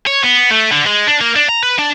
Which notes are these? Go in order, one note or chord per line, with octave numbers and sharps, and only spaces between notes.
C#5
B3
A3
D3
G#3
D4
A#3
D4
A#5
B4
D4